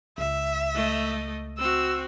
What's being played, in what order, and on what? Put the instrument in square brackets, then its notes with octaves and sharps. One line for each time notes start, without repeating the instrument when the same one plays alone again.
[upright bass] C#2 [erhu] E5
[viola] A3 D#5
[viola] C4 F#4 [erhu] E6